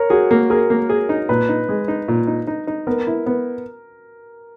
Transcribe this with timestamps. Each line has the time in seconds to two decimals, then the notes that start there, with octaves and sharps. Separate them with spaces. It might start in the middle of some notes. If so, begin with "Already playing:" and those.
Already playing: A#4 C#5
0.10 F#4 G#4
0.31 A#3
0.50 G#4 A#4
0.70 A#3
0.89 G#4
1.09 D#4
1.29 A#2 B4
1.49 D#4
1.69 G#3
1.88 D#4
2.08 A#2
2.27 D#4
2.47 D#4
2.67 D#4
2.87 B3 A#4
3.07 E4
3.26 B3